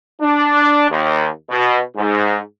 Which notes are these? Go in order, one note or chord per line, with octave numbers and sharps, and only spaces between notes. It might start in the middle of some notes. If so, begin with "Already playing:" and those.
D4
D#2
B2
G#2